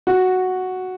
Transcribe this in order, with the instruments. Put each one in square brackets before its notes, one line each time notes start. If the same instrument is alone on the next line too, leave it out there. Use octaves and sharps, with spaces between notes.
[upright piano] F#4